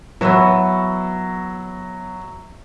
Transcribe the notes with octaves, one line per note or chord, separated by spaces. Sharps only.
E3 F#3 B3 C#6 E6